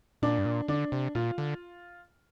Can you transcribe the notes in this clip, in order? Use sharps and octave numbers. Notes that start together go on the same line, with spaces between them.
A#2 D4
G2
A#2
D3 D4
C3
A#2 F4
D3